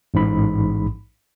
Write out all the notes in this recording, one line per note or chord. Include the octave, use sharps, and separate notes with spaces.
A1 G#2 B5